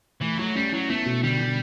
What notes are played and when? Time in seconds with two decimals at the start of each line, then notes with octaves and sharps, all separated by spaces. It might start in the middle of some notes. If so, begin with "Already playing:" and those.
0.22 E3 A3
0.39 F#3 A3
0.55 G3 C#4
0.72 F#3 E4
0.89 A3 B3
1.06 B2
1.22 D3 G3
1.40 D3